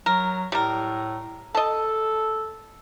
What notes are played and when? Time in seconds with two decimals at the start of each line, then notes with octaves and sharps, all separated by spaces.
0.06 F#3 A#4
0.52 A2 G3 A#4
1.55 A4 D#5 A5